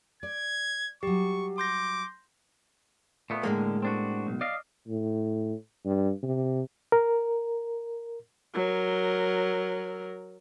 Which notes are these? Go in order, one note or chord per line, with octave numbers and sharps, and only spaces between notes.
D5 G#6
F#3 G3 G4 C#6
C6 D6 G6 A#6
A#2 A3 B3
A2 D3 G#3 A#3
C4 D4 F#4
B1
D5 D#5 F5
A2
G2
C3
A#4
F#3 A#4